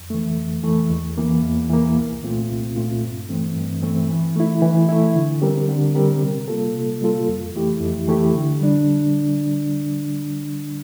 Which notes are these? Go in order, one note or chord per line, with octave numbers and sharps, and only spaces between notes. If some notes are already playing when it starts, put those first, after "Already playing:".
Already playing: F2
E3 A3
F2
E3 A3
E2
E3 A#3
E2
E3 A#3
C2
A#2 A3 C4 F4
C2
A#2 A3 C4 F4
G2
E3 A3 C4
G2
E3 A3 C4
E3
A3 E4
E3
A3 E4
D3
G3 C4 G4 A#4
D3
G3 C4 G4 A#4
C3
G3 A#3 F4 A4
C3
G3 A#3 F4 A4
F2
E3 A3 E4 G4
F2
E3 A3 E4 G4
D3
G3 D4